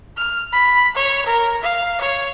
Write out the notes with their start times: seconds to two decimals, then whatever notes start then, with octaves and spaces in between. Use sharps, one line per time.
0.17 F6
0.52 B5
0.95 C#5
1.26 A#4
1.63 F5
2.01 C#5